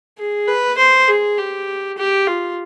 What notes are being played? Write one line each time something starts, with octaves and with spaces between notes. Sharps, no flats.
G#4
B4
C5
G#4
G4
G4
F4